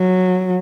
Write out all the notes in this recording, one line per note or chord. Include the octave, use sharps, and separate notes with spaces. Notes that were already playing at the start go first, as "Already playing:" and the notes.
Already playing: F#3